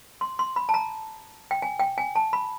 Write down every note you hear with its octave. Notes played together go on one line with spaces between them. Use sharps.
C6
C6
B5
A5
A#5
G5
G#5
G5
G#5
A5
B5